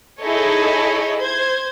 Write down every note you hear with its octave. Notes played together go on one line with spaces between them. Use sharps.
D#4 E4 G#4 A4 C#5 D#5
C5 G#6